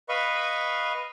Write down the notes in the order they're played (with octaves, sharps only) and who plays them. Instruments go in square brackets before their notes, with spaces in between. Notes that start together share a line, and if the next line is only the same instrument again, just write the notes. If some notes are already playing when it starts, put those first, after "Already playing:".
[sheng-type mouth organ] B4 D#5 F5 B5 C#6